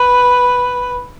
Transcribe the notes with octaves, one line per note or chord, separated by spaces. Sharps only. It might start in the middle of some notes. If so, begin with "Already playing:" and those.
Already playing: B4